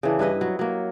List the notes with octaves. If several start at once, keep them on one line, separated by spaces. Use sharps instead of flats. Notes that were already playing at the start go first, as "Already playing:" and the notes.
C#3 E3 D4
G2 E4 B4 D#5
F#3
F#3 A#3